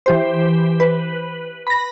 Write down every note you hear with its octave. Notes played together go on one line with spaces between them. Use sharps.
E3 G4 C5
B4
B5 A#6